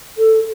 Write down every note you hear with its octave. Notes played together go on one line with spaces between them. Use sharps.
A4